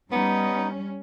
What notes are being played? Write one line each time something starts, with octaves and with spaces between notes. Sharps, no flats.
G3 B3 C#4 D#4